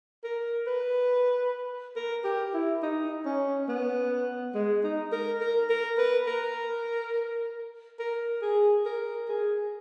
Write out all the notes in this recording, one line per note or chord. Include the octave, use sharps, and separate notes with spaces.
A#4
B4
A#4
G4
E4
D#4
C#4
B3
G#3
D#4
A#4
A#4
A#4
B4
A#4
A#4
G#4
A#4
G#4